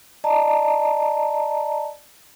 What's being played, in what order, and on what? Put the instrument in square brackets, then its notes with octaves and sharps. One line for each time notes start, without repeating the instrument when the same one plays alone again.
[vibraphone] D5 D#5 A5 A#5